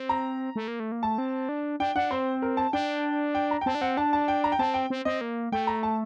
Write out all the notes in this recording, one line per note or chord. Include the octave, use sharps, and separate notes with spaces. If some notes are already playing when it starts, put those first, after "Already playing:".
Already playing: C4
A#5
A3
A#3
A3
A#3
A3 A5
C4
D4
D4 G5
D4 F#5
C4 C5
A#4
A5
D4 G5
G5
A#5
G5
C4 A5
D4
C4 F#5
D4 A5
A5
G5
A#5
G5
C4 A5
G5
C4
C4 D#5
A#3
A3 G5
A#5
A5